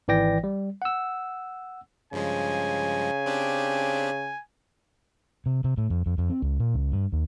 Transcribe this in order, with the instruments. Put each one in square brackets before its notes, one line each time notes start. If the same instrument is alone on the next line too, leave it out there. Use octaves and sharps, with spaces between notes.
[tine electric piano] G#1 E3 D5 G5 A#6
G3
F#5 E6
[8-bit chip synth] G2 F3 G#3 [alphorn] C#3 [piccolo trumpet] G#5
[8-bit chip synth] C4 D4 G4
[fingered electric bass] C3
C3
A2
F2
F2
F2
C4
C#2
A#2
C#2
G2
D#2